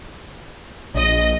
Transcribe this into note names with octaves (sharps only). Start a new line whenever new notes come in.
A#1 D#5